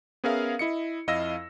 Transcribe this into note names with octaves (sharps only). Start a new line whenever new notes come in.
B3 C#4 G#4 A#4 E5 F5
E4 D#5 C#7
F2 E4 D#5 F5 E6 A#6